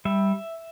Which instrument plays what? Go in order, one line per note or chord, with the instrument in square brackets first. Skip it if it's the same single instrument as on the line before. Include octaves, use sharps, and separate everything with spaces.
[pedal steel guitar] G3 E5